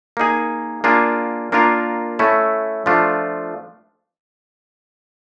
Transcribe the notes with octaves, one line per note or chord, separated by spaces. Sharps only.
A#3 D#4 G#4
A#3 D4 F4 G#4
A#3 D4 F4 A#4
A3 C#4 E4
F3 A3 D4 F4